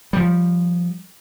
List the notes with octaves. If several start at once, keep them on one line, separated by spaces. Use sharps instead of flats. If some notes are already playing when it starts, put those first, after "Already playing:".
F3 G3